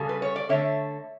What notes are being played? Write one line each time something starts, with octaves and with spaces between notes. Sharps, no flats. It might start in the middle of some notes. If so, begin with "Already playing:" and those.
Already playing: C#3 G3 A4
B4
C#5
D5
D3 A3 C#5 E5